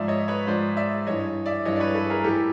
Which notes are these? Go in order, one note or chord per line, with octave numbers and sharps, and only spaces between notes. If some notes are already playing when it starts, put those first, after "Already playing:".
Already playing: G#2 F3 D5 E5
C#5 D#5
B4 C#5
G#2 F3 C5 D5
D5 E5
G2 E3 C#5 D#5
D5 E5
G2 E3 C#5 D#5
D5
B4 C#5
A4 B4
G#4 A#4
A2 E3 G4 A4